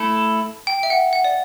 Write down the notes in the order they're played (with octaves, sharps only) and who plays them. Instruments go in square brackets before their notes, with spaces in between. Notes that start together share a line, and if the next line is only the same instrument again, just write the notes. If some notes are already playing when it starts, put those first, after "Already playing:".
Already playing: [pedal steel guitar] A3 E4 A4 [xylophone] A5
[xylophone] G5
E5
F#5
F#5
D5